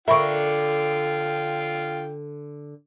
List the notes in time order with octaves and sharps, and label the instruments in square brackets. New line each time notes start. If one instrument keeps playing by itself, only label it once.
[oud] D3 A#4 [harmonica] F4 G5 [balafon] E5 B5 C#6